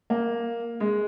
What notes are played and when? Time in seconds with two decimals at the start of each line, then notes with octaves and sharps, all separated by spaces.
0.10 A#3
0.80 G#3